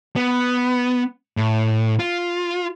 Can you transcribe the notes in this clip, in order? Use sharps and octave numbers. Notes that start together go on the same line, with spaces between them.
B3
A2
F4